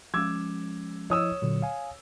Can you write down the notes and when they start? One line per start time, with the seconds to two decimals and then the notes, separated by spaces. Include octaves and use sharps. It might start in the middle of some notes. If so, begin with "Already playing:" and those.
0.14 F3 G#3 C#4 D6 E6 G#6
1.10 F3 E4 C#5 D#5 D#6 E6
1.42 A#2 D3 F#3
1.62 F5 G#5